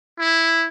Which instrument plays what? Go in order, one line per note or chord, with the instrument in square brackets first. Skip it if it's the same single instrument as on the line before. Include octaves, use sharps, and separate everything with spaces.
[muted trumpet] E4